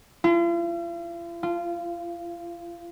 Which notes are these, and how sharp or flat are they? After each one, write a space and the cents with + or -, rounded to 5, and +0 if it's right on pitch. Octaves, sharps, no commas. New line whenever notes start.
F4 -45
F4 -20